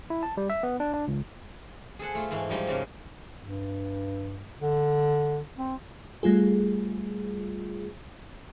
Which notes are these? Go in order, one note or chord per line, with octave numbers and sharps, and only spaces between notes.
E4
A5
G3
E5
B3
D4
D4
C#2
G#4 A4 C5 F#5
A3 F4
G#2 E3 A3
G#2 F3 G3 D#4
G#2 C#3 A#3
G2
D3
C4
G3 A3 F4 G#4